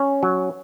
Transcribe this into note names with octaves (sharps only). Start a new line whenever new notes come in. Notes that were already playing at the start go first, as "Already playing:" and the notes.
Already playing: C#4
F#3